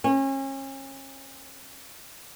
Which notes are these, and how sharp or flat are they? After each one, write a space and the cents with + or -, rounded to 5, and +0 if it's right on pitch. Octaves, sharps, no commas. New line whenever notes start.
C#4 -35